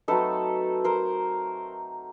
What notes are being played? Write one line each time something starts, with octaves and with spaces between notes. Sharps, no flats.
F#3 A3 C4 D#4 A4 B4
A#4 C5